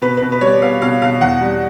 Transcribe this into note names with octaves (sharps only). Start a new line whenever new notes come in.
B2 B4
B2 B4
B4
G3 C#5
D5
B3 F5
B2 F5
B2 F5
E2 F#5
G3